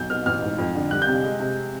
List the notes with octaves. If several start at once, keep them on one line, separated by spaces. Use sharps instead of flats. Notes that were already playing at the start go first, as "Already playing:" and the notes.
Already playing: B1 G6
B2 F6
A1 F6
G#2
F2
D3
G3 F#6
G6
C3
G#3
C3